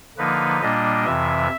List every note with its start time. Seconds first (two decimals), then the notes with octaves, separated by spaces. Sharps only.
0.17 D3 F3 A#3 D#4 B4
0.61 A#2 G3 A#3 D4 D#5
1.05 F2 C3 E3 E5